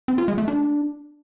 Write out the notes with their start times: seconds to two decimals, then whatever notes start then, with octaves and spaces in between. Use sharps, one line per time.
0.08 C4
0.18 F4
0.28 G#3
0.38 A3
0.48 D4